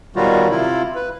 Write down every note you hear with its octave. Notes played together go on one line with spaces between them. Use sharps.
B2 D#3 F#3 G3 F4 F#4
C3 E4 F4
B4